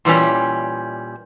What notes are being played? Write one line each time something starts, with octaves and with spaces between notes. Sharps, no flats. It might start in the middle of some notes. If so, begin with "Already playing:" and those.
A#2 E3 G3 C#4